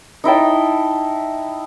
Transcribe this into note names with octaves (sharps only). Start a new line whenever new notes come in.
D#4 E4 G5 A5